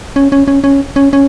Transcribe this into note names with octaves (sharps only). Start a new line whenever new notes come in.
C#4
C#4
C#4
C#4
C#4
C#4